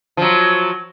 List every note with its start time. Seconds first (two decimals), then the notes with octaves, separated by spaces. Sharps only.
0.17 F3 F#3